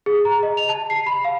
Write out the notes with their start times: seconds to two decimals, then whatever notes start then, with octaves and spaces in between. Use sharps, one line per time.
0.06 G#4
0.25 A#5
0.43 D#5
0.57 F7
0.69 A5
0.90 C7
1.07 B5
1.25 F5